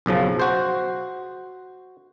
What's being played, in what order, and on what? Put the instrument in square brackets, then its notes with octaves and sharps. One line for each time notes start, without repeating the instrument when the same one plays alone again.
[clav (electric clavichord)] B1 F#2 C#3 F3
F#4 C5